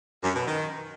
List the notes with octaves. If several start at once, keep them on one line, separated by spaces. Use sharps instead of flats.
F#2
B2
D#3